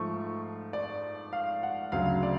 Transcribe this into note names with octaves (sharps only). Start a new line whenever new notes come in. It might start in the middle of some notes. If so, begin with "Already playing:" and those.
Already playing: G#2 F3 A3 C#6
D5
F5
F#5
D2 C#3 F#3 F5
D5